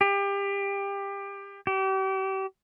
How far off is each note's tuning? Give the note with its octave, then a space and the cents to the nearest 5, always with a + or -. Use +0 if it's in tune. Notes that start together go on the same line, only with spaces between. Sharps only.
G4 +25
G4 -35